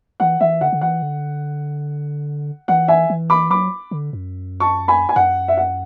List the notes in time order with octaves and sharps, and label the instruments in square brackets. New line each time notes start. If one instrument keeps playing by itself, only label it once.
[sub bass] E3 [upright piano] F#5
[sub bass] E3 [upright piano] E5
[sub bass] D3 [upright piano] F#5
[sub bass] D3
[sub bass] E3 [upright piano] F#5
[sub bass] D3
[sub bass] E3 [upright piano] F#5
[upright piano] E5 G#5
[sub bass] E3
[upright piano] B5 D6
[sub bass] F#3 [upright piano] B5 D6
[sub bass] D3
F#2
[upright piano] A5 C#6
G#5 B5
G#5
[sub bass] F#2 [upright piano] F#5
[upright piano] E5
F#5